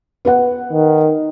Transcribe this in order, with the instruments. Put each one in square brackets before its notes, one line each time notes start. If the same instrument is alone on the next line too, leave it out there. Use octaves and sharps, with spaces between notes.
[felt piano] B3 B4 F#5
[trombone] D#3